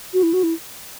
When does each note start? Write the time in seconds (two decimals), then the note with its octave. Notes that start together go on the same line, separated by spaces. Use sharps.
0.14 F#4
0.23 E4
0.33 F#4
0.43 E4